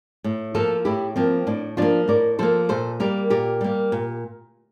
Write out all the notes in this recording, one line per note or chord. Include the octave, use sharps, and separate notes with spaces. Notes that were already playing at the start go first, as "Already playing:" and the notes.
A2
F3 A#3 F4 A4
A2 E4 G4
F3 A#3 C4
A2 D4
F3 A#3 D4 F4
A2 A#4 D5
F3 A#3 A4 C5
A#2 A4 C5
G3 A#3 G4 A#4
A#2 G4 A#4
G3 A#3
A#2